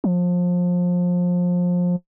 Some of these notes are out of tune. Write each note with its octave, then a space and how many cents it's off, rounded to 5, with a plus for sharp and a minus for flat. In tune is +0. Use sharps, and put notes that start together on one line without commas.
F3 +25